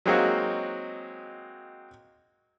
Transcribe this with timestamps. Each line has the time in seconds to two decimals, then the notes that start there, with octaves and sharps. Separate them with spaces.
0.06 F#3 G#3 A#3 C4 D#4 F#4